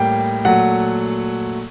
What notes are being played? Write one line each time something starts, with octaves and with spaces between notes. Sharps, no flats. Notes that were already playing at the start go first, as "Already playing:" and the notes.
Already playing: A2 G3 A#3 G5
A#2 F#3 A3 F#5